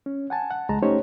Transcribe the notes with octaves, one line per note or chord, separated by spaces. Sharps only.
C#4
F#5 G#5 A5
F#5
C#2 G#3 A5 A#5
A3 C#4 D#4 G4 C5 C#5